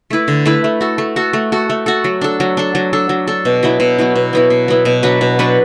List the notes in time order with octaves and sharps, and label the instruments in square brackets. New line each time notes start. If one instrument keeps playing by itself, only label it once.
[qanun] A3 E4 B4
D3
A3 E4 B4
A3
F#4 A4
A3
F#4 A4
A3
F#4 A4
A3
F#4 A4
F#3
D4 A4
F#3
D4 A4
F#3
D4 A4
F#3
D4 A4
B2
F#3 B3 E4
B2
F#3 B3 E4
B2
F#3 B3 E4
B2
F#3 B3 E4
B2
F#3 D4 B4
B2
F#3 D4 B4